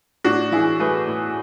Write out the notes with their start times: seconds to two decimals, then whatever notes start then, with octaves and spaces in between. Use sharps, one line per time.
0.24 A2 D4 F#4
0.52 E3 E4 G#4
0.80 A3 G#4 B4
1.07 A2